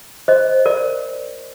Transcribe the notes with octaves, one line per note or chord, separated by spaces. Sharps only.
C5 D#5
A#4 D5